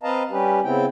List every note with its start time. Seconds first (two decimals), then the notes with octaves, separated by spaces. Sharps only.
0.03 C4 B4 D#5 F5 A5 A#5
0.30 G3 C#4 G4 B4
0.63 C#3 B3 C4 E4 G5